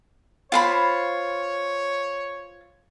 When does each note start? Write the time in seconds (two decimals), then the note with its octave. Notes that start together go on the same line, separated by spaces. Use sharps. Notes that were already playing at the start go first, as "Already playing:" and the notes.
0.52 F4 C5 C#5 B5